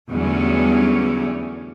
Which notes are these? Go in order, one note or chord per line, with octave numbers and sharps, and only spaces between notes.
E2 D3 F#3 G3 A3 C#4